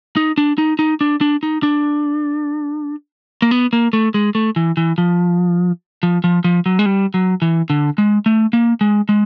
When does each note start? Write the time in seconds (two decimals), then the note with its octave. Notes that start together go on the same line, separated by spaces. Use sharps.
0.17 D#4
0.38 D4
0.58 D#4
0.79 D#4
1.01 D4
1.21 D4
1.43 D#4
1.63 D4
3.42 A#3
3.51 B3
3.73 A#3
3.93 A3
4.14 G#3
4.35 A3
4.56 E3
4.77 E3
4.98 F3
6.03 F3
6.24 F3
6.44 F3
6.66 F#3
6.79 G#3
6.86 G3
7.14 F#3
7.42 E3
7.70 D3
7.98 G#3
8.26 A3
8.53 A#3
8.81 G#3
9.09 G#3